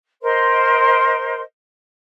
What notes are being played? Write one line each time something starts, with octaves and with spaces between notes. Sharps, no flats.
A#4 C5 D#5 C6